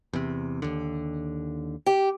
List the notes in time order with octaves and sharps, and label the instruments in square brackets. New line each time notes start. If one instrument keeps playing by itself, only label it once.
[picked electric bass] E2 C3
D#2 D3
[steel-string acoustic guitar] G4